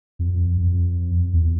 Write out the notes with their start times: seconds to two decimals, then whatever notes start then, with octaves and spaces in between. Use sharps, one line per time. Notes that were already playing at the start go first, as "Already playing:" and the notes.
0.19 F2
0.57 F2
1.33 E2